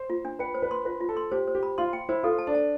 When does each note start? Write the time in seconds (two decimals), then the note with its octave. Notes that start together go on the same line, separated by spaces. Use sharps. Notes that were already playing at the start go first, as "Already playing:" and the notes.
Already playing: C5
0.10 F4
0.25 D4
0.39 B4 G5
0.54 C5
0.62 B4
0.71 C6
0.85 F4 B4
1.00 F4
1.09 A4
1.17 C6
1.32 G4 C5
1.48 C5
1.55 G4
1.63 B5
1.78 F4 C6
1.93 G5
2.09 E4 C5
2.23 F4 A4
2.38 A5
2.47 D4
2.54 A5